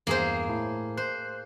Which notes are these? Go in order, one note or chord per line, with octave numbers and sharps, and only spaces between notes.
E2 G2 A#3 G#4 C5
A2
C5 F#6